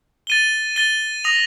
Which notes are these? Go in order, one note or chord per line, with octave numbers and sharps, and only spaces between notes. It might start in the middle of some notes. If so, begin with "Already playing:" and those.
A6 D#7 G7
A6 D#7 G7
D#6 A#6 F7